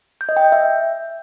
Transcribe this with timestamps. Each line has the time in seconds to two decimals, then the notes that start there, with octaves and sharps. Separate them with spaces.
0.21 G6
0.29 D#5
0.37 G5
0.44 G6
0.52 E5